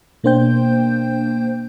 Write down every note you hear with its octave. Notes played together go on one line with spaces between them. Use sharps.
B2 A#3 D4 C5 G5 G6